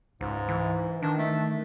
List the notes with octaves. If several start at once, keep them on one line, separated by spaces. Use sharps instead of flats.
C#2 G#2
E3
D#3 D4
A3